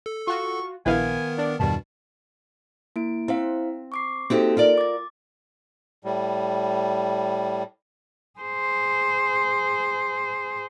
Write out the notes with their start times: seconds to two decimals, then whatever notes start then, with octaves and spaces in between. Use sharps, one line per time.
0.06 A4
0.27 F4 F#4 C#6
0.86 A#1 D#3 B3 E4 A#4 B4 F5 G#5
1.38 D4 D5
1.60 E2 G2 B2 D#3 G3 A5
2.96 A#3 E4 D7
3.28 C4 E4 C5 F5
3.92 C#6 D6 C7
4.30 A#3 C4 D#4 F#4 G4 A4
4.57 F4 A#4 D5
4.78 D6 A6
6.04 A2 G3
8.40 G#4 C5